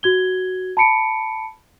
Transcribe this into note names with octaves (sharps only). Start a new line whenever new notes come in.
F#4 G#6 G7
A5 B5 C#7 D7